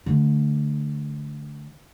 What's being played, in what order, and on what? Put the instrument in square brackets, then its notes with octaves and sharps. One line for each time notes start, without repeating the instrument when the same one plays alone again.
[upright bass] D3 A3